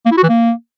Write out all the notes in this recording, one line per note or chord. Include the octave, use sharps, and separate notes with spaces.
A#3
E4
F#4
E3
A#3